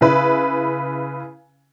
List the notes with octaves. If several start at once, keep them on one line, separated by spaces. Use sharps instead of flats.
C#3 E4 B4